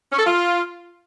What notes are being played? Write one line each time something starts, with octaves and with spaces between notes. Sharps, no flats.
C#4
A4
F4